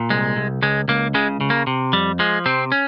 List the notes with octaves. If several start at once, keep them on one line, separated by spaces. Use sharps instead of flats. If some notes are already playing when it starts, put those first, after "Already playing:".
Already playing: A#2
C2 G#3
C2
C#2 G#3
C#2 A#3
C#3 G#3
C#3
A#3
C3
F2 G3
F3 G#3
C3 C4
C#4